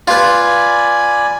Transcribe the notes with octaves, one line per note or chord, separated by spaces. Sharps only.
F4 B4 D5 G#5 B5